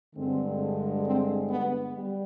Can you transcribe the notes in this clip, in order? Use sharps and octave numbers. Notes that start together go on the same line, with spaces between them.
G2 D3 G#3 C4
C4
B3
G3